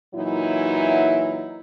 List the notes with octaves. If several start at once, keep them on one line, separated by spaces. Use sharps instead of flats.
A#2 E3 F#3 D#4 E4